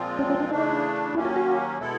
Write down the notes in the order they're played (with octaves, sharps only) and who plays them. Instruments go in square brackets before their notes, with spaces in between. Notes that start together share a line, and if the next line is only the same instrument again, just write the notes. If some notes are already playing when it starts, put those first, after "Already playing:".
Already playing: [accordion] A#2 F3 G#3 C4 F4
[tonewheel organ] C#4
C#4
D4
[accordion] C#3 E3 A3 D4 [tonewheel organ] D#4
[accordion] D#2 D#3 F#3 A#3 C#4 [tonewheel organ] E4
[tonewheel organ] F4
F#4
[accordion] B2 G#3 B3 E4 A4